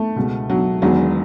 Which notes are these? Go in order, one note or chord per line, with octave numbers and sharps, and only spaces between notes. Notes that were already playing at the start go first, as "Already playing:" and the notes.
Already playing: A3
C#2 B2
F#3
E1 E2 D#3 F#3